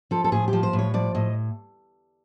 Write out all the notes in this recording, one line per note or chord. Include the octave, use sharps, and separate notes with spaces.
F3 A4
A4
A2 G#4
G4
F3
C5
A2
C#5
F3 D5
A2 D#5